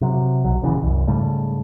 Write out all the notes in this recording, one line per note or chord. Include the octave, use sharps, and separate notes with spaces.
C3 F#3
B1 F#3
D#1 D#2 C#3 E3
C2 F#2
G#2 C#3 G3 A3